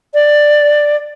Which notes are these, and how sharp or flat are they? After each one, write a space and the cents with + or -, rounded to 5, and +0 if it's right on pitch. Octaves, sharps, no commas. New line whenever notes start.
D5 +10